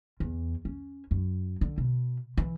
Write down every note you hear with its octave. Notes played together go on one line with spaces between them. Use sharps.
E2
C#4
F#2
D3
B2
E3